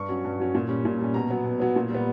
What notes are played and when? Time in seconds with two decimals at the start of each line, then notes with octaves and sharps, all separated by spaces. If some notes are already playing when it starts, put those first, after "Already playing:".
Already playing: G2 C#6
0.09 F#3 C#4
0.24 G2
0.40 F#3 C#4
0.55 A#2
0.69 G3 C#4
0.85 A#2
0.99 G3 C#4
1.14 B2 A#5
1.30 F#3 B3
1.45 B2
1.60 F#3 B3
1.76 A#2
1.90 G3 B3